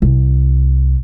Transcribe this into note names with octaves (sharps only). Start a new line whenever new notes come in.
C2